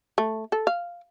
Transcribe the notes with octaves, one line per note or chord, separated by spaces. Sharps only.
A3
A4
F5